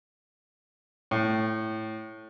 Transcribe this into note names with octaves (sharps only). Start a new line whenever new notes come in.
A2